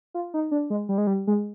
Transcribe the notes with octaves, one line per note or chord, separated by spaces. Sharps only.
F4
D#4
D4
G#3
G3
G#3
G3
G#3